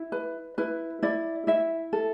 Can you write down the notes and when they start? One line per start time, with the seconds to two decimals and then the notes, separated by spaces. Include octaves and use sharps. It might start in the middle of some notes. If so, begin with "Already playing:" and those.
Already playing: E4
0.12 B4
0.58 E4 B4
1.02 E4 D5
1.47 E4 E5
1.93 A4